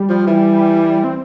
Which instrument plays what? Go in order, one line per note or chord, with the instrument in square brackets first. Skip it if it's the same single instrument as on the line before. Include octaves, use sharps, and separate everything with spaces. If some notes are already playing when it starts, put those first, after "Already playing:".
Already playing: [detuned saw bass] G3
[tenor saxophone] F3
E3
[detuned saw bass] C4